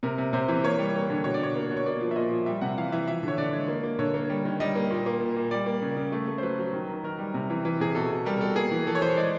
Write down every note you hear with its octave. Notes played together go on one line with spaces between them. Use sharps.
C3 A#4
C3
C3 C5
E3
A#3 C#5
G3
A#3
D3
B2 C#5
D5
B2 C#5
A#3
B2
C#5
A#3 D5
F3
E5
A#2 D#5
F3
G3 E5
C3 F#5
E3 F5
E3 E5
F3 E5
D3 C#5
D3 D5
G#3
A#3
A#3
D3 C#5
A#3
G3
D#3
G3 D#5
A#3
A#2
A#3
A#2
A#2
G3 D5
A#3
C#3
C#3
A3
A3
C5
F#3 B4
F#3
D#3
D#3
D#3 A#4
G3
C3
E3
E3
C3 G#4
B2 A4
B2
G3 A#4
A#4
B2 A4
A#3 G#4
E3
E3 A4
C#5
E3 C5
G#3 D5